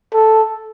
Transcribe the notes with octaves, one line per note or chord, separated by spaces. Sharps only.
A4